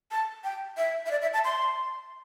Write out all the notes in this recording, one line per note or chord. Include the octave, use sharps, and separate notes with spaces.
A5
G5
E5
E5
D5
E5
A5
C6